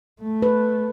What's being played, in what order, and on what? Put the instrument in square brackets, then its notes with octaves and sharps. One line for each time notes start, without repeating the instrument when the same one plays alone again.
[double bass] A3
[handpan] B4